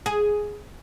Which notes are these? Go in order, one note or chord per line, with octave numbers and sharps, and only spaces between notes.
G#4